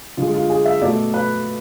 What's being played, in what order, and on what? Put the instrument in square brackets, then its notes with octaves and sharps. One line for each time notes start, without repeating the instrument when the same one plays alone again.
[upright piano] D3 G#3 F4
F4
G#4
E5
B2 A3 D5
B4